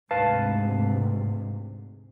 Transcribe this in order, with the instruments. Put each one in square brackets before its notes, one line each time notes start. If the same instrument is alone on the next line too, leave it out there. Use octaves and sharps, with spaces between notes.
[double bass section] D2 G#2 C3 [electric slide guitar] B4 F5 A5